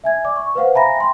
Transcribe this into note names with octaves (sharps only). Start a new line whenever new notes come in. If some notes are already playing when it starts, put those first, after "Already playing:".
E5 G#5 G#6
D5 D6
C#6
B4 C5 F5 F#5
E5 G#5 A#5 B5 A#6
G5 C6